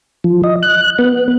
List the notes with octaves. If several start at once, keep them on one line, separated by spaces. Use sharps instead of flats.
F3
D#5
F#6
B3